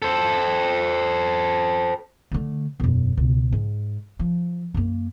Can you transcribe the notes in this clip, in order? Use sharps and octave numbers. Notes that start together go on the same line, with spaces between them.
A4 C5
D3 A3
E1 F#2
C#2 B2
G#2
F3
F#2 A#3